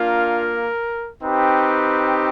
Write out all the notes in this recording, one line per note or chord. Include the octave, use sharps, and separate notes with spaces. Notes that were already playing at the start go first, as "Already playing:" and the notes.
Already playing: A#3 D4 F4 A#4
C4 D#4 G4 B4